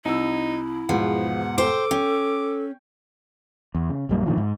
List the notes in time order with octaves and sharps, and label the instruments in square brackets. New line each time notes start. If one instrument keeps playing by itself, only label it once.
[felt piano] C2 E6 [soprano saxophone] D#4 [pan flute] E4
[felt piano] E2 G#2 B2 [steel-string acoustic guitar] F3 [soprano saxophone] F#5
[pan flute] A4 [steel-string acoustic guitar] C5 G5 [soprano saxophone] D6
[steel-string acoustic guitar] C#4 [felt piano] G5
[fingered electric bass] E2
C#3
A#1 F#2 G3 A#3
A#2 D3 D#3 F3
G#2